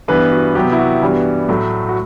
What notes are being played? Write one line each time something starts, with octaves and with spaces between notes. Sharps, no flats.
G2 E3 B3 B4
F#4
C3 F#3 B3 G4
E4
F#4
G2 E3 G3 B3
A2 F#3 A3
F#4